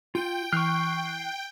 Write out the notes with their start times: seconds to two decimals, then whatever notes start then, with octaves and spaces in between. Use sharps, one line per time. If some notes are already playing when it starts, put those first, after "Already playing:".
0.15 F4 G5
0.53 E3 C#6 F6 F#6 C7